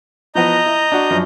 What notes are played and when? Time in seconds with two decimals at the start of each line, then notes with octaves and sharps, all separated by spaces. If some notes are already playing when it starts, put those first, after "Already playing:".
0.35 E3 F3 B3 D#5 A#5 G6
0.66 E4
0.92 D4 F#4
1.10 F#2 F3 D4